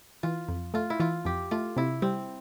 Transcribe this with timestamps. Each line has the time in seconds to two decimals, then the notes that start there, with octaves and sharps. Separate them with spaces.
0.23 E3 F4
0.48 F2
0.74 A3 F4
0.90 E4
1.00 E3 F4
1.25 F2 G4
1.51 A3 F4
1.76 C3 E4
2.02 G3 C4